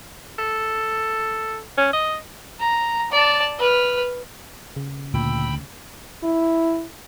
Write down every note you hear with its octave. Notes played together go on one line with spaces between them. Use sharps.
A4
C#4
D#5
A#5
D5 A5
B4 F6
C#3
D2 A#2 G5 B5 E6
E4